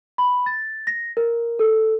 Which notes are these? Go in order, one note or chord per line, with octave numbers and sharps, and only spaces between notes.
B5
A6
A#6
A#4
A4